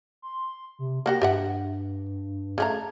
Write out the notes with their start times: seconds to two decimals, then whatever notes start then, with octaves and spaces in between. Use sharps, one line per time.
0.22 C6
0.79 C3
1.06 A#3 F#4 G4 A#6
1.22 G2 G4 E5 F#5
2.58 C#3 A3 A#5 G#6